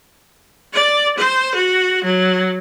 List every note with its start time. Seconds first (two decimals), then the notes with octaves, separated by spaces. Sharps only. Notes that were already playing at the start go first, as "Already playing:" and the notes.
0.74 D5
1.18 C5
1.55 F#4
2.05 F#3